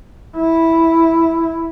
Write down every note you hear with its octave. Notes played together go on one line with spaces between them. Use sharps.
E4